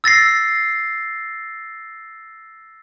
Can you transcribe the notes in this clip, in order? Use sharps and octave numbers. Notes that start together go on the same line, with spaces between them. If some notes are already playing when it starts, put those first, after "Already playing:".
E6 A6 A#6 C7